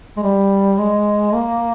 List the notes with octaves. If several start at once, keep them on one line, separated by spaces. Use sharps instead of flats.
G#3
G3
G#3
A#3